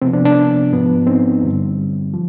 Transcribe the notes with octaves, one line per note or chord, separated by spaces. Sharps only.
C3 F3 B3 C4
D4
D4
G#2 F3 B3
C4 D#4
G2 D3 G3
F3